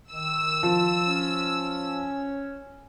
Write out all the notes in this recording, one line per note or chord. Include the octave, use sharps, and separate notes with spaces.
D#3 E6
F3
C#4